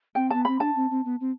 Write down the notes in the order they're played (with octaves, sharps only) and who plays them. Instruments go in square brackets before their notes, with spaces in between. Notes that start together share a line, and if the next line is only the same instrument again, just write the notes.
[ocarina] C4 [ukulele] G5
[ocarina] B3 [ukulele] A5
[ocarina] C4 [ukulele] B5
[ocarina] D4 [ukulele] A5
[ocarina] C4
C4
B3
C4